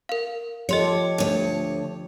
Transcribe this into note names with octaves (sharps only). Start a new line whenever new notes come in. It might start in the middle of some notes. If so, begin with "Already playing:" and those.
A#4 F5
F3 G4 A4 C#5 D#5 C6 C#7
D2 C#5